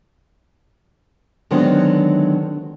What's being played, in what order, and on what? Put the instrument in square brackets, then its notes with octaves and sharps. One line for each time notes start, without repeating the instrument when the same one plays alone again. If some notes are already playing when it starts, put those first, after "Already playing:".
[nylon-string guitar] D3 D#3 F#3 G#3 B3 C4